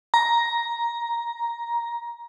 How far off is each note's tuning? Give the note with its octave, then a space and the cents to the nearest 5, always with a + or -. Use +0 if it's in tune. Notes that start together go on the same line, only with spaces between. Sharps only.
A#5 +10